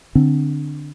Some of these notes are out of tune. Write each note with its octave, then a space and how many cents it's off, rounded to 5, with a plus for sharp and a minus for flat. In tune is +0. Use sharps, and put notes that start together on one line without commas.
D3 +5 C4 +0